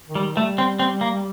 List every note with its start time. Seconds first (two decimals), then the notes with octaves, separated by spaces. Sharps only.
0.08 D#3
0.15 G3
0.37 G3 A3
0.58 C4
0.79 C4
1.01 A#3